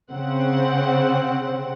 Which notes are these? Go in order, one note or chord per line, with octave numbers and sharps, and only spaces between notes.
C#3 C4 F#5